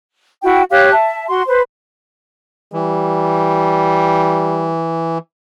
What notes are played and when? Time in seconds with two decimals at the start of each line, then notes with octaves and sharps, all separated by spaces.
0.44 E4 F#4 G5
0.71 G4 C#5 F5 F#6
0.93 E5 A5
1.28 F#4 C6
1.47 B4 C5
2.73 E3 G3